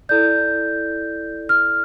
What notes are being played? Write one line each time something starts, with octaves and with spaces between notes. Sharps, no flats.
E4 A4 D5 G6
F6